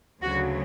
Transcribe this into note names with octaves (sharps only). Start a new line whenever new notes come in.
D2 C#3 F#3 F#4